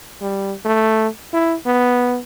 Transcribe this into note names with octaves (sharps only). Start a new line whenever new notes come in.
G3
A3
E4
B3